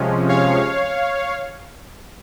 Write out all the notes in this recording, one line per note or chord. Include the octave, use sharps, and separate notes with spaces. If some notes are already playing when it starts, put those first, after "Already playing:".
Already playing: C3 F3 G#3 C#4
C#5 F5